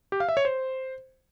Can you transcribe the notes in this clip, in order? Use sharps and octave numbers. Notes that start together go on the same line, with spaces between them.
G4
F5
E5
C#5
C5